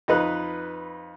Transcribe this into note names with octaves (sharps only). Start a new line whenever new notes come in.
F2 D#4 B4 F#6